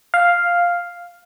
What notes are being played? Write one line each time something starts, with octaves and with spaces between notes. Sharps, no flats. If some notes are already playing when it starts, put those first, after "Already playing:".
F5